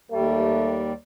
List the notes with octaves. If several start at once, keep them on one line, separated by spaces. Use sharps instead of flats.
D#2 G3 A3